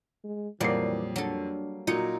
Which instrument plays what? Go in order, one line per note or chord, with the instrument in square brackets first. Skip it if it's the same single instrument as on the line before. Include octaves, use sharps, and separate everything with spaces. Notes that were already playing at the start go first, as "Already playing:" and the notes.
[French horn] G#3
[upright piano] F2 [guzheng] A#2 F#3 D5 [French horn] E3 [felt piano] G3 A#3 C7
[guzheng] F#3 A4 [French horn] D4
[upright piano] A#2 F#3 C#7 [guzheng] D#4